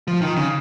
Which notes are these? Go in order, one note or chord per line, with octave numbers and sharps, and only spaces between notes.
F3
D#3
C#3